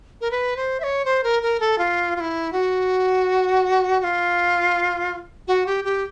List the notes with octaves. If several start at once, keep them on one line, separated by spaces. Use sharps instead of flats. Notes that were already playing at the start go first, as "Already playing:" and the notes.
A#4
B4
C5
E5
C#5
C5
A#4
A#4
A4
F4
F4
E4
F#4
F#4
F4
F#4
G4
G4